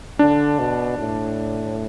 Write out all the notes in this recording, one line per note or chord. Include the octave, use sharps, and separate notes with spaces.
D3 D4
B2
A2